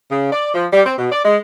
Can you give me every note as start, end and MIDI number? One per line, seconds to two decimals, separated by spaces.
0.11 0.28 49
0.32 0.51 74
0.54 0.67 53
0.72 0.81 55
0.85 0.94 60
0.98 1.08 47
1.12 1.20 74
1.25 1.38 56